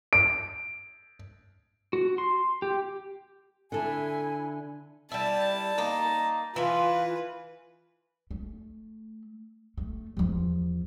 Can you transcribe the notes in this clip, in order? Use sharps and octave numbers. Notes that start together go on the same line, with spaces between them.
D7
F#4
C6
G4
D3 E4 A4 G#5
G3 E4 A5
A#3 D#4 A#5
E3 F4 B4 G#5
A3
A3
E2 F3